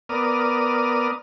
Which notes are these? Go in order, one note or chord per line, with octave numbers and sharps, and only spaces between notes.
B3 A#4 D5 D#6 F6